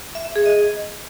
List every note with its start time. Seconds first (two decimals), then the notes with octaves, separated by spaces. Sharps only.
0.15 E5
0.25 E5
0.36 G#4
0.46 D#5